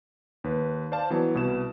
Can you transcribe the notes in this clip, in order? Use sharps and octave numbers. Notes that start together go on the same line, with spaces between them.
D#2 B4
C5 D5 F5 A5
E3 F#3 B3
C2 B2 B4 E7